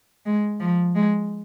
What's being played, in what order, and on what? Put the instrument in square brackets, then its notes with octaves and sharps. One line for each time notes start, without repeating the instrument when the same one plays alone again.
[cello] G#3
F3
G#3